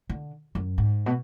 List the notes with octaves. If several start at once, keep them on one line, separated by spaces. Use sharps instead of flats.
D3
F#2
G#2
B2